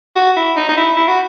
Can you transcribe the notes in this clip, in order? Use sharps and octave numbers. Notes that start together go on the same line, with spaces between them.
F#4
E4
D#4
D#4
E4
E4
F#4